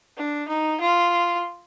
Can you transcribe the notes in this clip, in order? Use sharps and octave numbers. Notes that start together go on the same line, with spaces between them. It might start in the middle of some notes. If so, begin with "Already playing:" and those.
D4
D#4
F4